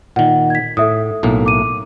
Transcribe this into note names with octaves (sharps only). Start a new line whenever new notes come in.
A#2 D#3 F#5
G#6 B6
A2 A4 E5 D#6
B1 A2 A#3
D6 D#7